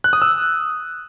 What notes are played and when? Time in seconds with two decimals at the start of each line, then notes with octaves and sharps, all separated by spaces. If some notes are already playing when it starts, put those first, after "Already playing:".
0.04 F#6
0.13 D#6
0.22 E6